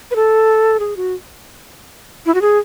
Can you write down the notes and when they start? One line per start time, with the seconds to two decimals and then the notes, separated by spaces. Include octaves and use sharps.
0.11 B4
0.16 A4
0.80 G#4
0.97 F#4
2.26 E4
2.35 F#4
2.42 G#4